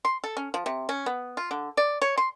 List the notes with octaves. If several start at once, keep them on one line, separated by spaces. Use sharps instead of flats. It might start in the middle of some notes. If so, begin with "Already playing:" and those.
C6
A4
C#4
F3
C3
C#4
B3
F4
D3
D5
C#5
C6